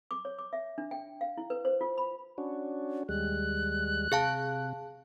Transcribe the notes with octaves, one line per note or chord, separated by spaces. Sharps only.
D6
C#5
D6
E5
D4
G5
F5
E4
B4
C5
F4
B5
C#4 D4 F#4
D#2 G3 G#3 F#6
C3 G#4 F5 A5